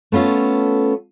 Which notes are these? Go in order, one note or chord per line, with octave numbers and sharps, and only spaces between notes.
A3 B3 C#4 F4 A4